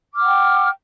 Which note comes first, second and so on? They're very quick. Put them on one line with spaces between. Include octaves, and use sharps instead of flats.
D6 F6 F#5 G5